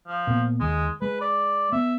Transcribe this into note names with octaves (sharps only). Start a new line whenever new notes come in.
F3
A#2 B3
D#2 D#3 G#3
G#3 B4
D5
B3 E5